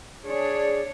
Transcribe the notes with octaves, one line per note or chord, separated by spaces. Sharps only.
D4 G#4 C#5 D5